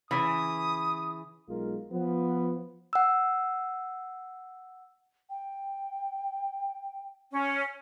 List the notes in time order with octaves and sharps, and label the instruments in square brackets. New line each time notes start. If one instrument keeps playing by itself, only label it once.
[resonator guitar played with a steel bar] C#3 E3 [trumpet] D#6
[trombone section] B1 G#3 F4 A#4
F3 B3
[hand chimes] F#5 E6
[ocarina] G5
[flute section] C#4